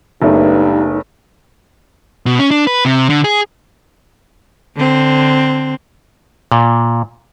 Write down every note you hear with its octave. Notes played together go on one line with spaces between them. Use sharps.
F#1 G2 A3 B3 D#4
B2
C#4
D4
B4
C3
D3
G#4
D3 C4
A#2